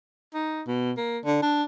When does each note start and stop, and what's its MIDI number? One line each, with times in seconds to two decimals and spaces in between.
0.34 0.62 63
0.67 0.92 47
0.97 1.19 58
1.25 1.41 50
1.42 1.63 62